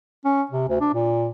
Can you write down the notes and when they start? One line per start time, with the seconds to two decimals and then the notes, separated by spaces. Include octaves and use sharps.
0.25 C#4
0.51 C3
0.69 D2
0.80 D4
0.93 A#2